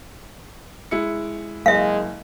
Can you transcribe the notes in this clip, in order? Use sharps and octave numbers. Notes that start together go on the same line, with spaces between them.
G#3 E4 C#7
F#1 G#3 E5 F5